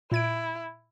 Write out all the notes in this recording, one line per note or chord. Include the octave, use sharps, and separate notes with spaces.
A#2 E4 G#6 D7